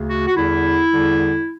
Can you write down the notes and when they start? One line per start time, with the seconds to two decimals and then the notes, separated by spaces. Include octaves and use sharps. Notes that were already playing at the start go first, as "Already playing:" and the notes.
Already playing: D2 C#3
0.09 F#4
0.26 F#4
0.35 E2 D3 G3 E4
0.90 E2 D3 G3